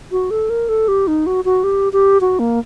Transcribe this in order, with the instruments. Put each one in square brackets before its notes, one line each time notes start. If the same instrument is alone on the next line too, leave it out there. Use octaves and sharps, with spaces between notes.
[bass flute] F#4
A4
A#4
A4
G4
D#4
F#4
F#4
G4
G4
F#4
A#3